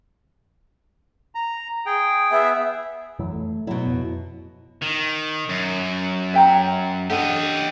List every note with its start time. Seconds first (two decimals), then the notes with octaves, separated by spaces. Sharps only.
1.35 A#5
1.86 G#4 G5
2.31 B3 G#4 E5
3.19 F2 E3 F#3
3.33 A3
3.67 B2 F#3 E4
3.87 F2
4.82 D#3
5.49 F#2
6.33 E5 G5 A#5
7.10 D4 G4 A4 D#5 F#5